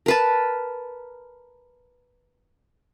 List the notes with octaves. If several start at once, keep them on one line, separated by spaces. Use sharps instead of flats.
A#4 B4 A5